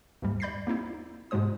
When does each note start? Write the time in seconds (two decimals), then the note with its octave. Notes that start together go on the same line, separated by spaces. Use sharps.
0.22 D#2 G#2 G3
0.40 D5 B5 G6 A6 B6 C7
0.67 A#3 C4 D#4 E4
1.31 G#2 B2 G#3 C5 D#6